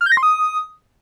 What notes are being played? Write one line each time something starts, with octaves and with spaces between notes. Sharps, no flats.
F6
G6
A#6
C6
D#6